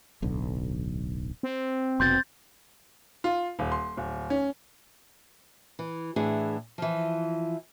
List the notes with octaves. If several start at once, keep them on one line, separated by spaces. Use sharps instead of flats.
D1 B1 D3
C4
F1 B2 C6 G6 A6
F4
D#1
C6
D1
C#4
E3
A2 E3 D4 G#4
E3 F3